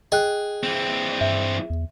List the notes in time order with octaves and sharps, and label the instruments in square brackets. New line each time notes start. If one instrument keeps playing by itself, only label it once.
[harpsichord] G#4 [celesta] D#5 G5 F#6
[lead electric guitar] E3 C4
[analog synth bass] G2 [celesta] E5
[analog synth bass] E2